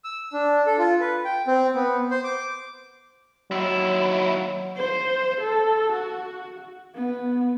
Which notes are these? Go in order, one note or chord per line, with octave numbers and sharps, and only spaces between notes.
E6
D4
A4
F4
B4
G5
C4
B3
C5
D6
D#2 F#3 E4
C5
A4
F#4
B3